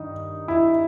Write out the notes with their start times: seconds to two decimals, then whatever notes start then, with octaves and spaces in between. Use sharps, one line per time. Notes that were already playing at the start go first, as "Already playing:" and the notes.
Already playing: G2 D#3 D#4
0.48 E4